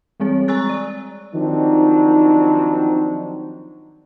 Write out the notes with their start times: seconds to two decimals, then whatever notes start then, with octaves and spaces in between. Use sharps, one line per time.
0.20 E3 G3 G#3 C4 G#4 C#5
0.48 G#5 A#5 C#6 E6 F#6 A6
0.69 D5
1.34 D#3 F3 F#3 C4 D4 D#4